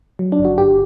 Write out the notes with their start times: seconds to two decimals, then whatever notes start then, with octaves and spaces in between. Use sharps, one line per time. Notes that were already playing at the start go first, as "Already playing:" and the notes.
0.19 F#3
0.32 D4
0.39 G1
0.45 F#4
0.58 G1 G4